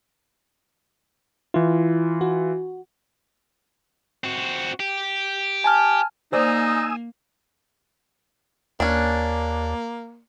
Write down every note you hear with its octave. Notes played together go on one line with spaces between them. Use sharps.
E3 E4 F4
F#4
C4 F#4
G4
G#5 A5 F6
A#3 D#4 C5 D5 G#5 D#6 E6
D#2 A#3 C#4 D4